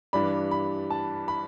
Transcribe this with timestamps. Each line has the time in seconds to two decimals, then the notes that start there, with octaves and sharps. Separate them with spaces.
0.13 G2 E3 G3 D4 B5
0.51 B5
0.90 A5
1.28 B5